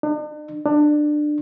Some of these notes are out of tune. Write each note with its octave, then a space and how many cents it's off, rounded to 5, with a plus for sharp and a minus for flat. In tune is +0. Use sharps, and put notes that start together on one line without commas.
D4 +45
D4 +20